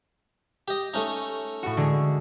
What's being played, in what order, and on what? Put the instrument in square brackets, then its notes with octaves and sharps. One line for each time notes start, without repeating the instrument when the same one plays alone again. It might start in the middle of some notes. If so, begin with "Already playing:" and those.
[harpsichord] G4 D#5
A3 C#4 D#4
[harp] A2 F#4
D3 G#3